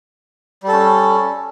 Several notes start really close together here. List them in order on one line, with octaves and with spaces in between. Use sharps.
G3 A4 C#4